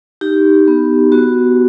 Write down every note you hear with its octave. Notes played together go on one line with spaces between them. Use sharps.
D#4 G4
B3
B3 F#4